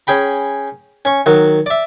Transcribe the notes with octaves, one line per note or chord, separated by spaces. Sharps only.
C#4 G#4 G5 B5
C#4 C#6
D#3 F#3 F#4
D5 E5